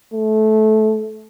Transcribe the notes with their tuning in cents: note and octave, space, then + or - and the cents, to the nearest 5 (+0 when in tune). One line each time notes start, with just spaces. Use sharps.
A3 -20